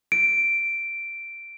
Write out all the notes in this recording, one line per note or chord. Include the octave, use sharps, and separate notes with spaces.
D7